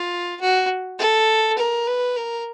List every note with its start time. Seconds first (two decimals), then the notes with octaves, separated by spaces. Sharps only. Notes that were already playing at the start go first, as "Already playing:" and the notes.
Already playing: F4
0.41 F#4
0.99 A4
1.58 A#4
1.87 B4
2.16 A#4